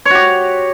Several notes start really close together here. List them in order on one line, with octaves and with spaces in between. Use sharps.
C#5 F#4 G4